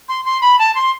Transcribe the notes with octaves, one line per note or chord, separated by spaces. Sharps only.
C6
C6
B5
A5
C6